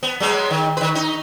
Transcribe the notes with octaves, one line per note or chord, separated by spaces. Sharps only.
B3
F#3 G#3 B3
D#3
D#3 B4
D#4